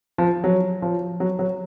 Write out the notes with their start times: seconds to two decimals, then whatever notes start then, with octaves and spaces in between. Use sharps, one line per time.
0.18 F3
0.44 F#3
0.82 F3
1.20 F#3
1.39 F#3